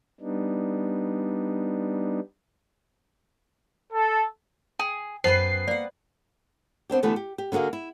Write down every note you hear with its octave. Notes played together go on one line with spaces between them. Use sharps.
G3 B3 D4 D#4
A4
G#4 G5
F#2 B3 B4 C5 G5 C7
A#3 D5 F#5
B3 C4 D4 G4
D3 E3 A3 B3 G4 B4
G4
G4
D3 A#3 F#4 G#4 F5
E4